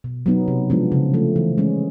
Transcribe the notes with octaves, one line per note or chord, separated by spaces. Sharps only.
B2
F#3 B3 D#4
C3
F3 G#3 B3 D4
C#3
F3 A3
E3
G#3 C#4